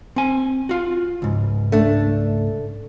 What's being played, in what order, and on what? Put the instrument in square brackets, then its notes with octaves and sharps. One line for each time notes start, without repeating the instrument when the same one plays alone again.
[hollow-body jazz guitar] C4 G#5
F4 F#4
C#2 G#2
[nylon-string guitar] A3 D4